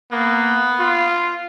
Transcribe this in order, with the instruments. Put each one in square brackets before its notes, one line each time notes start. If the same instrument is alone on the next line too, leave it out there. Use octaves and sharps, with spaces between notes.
[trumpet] A#3 [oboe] B3
[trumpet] F4